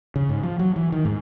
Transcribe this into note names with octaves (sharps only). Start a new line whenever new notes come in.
C#3
G#2
F3
F#3
E3
D#3
G#2